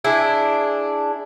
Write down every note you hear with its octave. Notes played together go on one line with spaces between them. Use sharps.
D4 E4 G#4